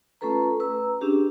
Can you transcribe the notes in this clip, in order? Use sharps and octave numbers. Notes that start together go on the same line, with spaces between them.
A3 C#4 F4 A4 B4 A#5
B4 A#5 E6
C#4 D4 G4 G#4